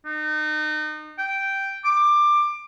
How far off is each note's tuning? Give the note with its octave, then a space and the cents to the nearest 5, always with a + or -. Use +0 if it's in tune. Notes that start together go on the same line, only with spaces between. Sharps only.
D#4 -30
G5 -5
D6 +15